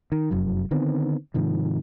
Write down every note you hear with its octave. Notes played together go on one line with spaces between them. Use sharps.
D#3
F1 F#2 F#3
D3 D#3 B3 C4
G#2 C3 D#3 F3